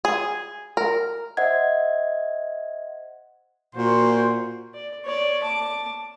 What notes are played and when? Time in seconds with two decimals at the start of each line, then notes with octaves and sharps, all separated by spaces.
0.05 G#4
0.77 A#4
1.37 C5 D#5 E5 F#5 G#6
3.75 A#2 F#4 C5
4.74 D5
5.05 C#5 D5
5.43 A5 D6